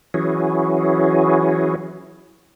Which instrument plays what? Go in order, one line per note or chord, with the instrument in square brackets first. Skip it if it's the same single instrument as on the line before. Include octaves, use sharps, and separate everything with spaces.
[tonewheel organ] E3 F#3 C#4 E4 F#4 G#4